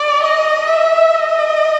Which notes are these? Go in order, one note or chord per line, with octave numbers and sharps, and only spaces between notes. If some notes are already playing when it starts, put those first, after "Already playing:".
Already playing: D5
D#5
E5
D#5